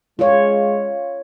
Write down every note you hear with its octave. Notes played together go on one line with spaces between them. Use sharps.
G#3 F4 C#5